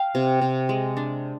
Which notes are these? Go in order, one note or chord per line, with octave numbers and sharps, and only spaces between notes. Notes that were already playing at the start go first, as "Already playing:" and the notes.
Already playing: F5 G5
C3
C3
G#3
D4